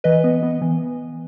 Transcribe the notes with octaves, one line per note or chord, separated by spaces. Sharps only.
E3 B4 D#5
B3
B3
E3